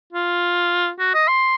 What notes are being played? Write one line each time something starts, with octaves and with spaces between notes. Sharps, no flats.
F4
F#4
D#5
C6